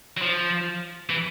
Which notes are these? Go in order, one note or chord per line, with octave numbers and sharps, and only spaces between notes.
F#3
F3
E3